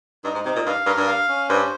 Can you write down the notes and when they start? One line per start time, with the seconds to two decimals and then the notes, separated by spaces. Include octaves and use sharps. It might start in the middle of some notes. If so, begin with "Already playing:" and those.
0.24 G2 D#4
0.35 G#2
0.45 C3 D#4
0.56 A#2
0.66 G2 F5
0.86 G2 A#4
0.97 G2
1.07 F5
1.29 C#4
1.49 G2 C5